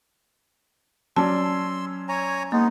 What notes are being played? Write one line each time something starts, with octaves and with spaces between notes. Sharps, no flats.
F#3 C#4 D5 A5 C6 E6
C#5 G#5 A#5
G#3 A#3 B3 D#4